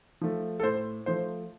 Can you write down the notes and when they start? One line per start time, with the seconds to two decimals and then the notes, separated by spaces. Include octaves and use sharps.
0.21 F3 A3
0.60 A4
0.63 A2 C5
1.06 F3 A3 C5